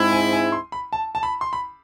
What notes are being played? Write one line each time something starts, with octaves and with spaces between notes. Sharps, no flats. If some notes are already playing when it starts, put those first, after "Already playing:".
Already playing: G#2 G#3 C4 E4
G#5
G#5
C6
B5
A5
A5
B5
C6
B5